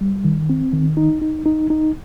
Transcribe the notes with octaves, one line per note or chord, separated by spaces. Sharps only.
G3
D#3
C4
D#3
D#4
D#4
D#4
D#4